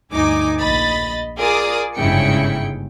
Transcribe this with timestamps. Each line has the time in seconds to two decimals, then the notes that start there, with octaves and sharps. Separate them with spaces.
0.12 D2 G2 D#4 G#5 D6
0.60 A#1 D#5 B5 A6
1.38 F4 G#4 A#4 D5 D6 D#6
1.95 G1 G#2 C#3 E4 G5 C#7